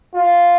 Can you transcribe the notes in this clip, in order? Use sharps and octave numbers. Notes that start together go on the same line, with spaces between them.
F4